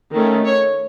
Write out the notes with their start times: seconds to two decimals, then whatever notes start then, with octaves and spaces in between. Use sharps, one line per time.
0.12 D#3 A3 C#4
0.45 C#5